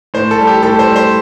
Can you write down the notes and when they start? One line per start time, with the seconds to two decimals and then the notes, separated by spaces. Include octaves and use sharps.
0.14 A2 C5
0.31 A4
0.38 G3
0.47 G4
0.63 A2 A4
0.79 C5
0.88 G3
0.96 C5